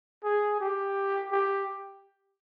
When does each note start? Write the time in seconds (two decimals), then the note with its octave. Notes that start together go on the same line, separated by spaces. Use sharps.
0.24 G#4
0.61 G4
1.32 G4